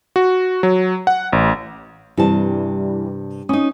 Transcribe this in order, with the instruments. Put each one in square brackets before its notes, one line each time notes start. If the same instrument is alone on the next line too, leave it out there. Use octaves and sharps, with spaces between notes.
[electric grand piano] F#4
F#3
F#5
A1
[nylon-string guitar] G2 C3 A5 [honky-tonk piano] E3 G3
[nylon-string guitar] C#4 D#4 [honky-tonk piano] D#6